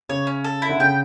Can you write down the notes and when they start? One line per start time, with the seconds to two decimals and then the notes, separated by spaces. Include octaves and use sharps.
0.09 C#3 C#5
0.27 C#4
0.44 A4
0.62 E4
0.69 D3
0.80 C#3 G5